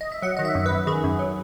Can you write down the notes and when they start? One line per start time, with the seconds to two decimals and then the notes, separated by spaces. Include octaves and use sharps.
0.01 D#5
0.12 E5
0.22 F#3 F#5
0.37 D#3 D#5
0.45 E5
0.55 F#2
0.66 B4
0.71 F#2
0.87 D#3 G#4
1.04 F#2
1.19 F#3